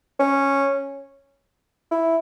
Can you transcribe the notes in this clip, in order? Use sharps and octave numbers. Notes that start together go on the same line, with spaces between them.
C#4
E4